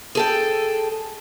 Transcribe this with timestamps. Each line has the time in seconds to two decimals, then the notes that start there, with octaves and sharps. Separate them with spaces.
0.15 G#4 A4 G5